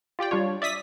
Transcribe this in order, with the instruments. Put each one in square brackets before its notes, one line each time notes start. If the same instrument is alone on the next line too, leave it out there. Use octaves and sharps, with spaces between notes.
[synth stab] F4 G4 D5 G5
G3 D4 F4 C#5
D5 E5 D#6 B6